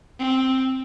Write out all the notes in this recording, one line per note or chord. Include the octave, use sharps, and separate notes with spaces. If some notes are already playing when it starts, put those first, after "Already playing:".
C4